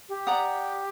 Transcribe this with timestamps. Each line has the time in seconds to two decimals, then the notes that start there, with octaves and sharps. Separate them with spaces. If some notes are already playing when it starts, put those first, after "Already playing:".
0.09 G4
0.27 D5 F#5 A#5 D#6